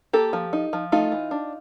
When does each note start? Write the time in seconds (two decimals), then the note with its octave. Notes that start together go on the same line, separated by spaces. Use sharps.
0.13 A#3 G4 A4
0.33 F3
0.53 D#4
0.73 F3
0.92 A3 D#4 F4
1.12 E3
1.31 D4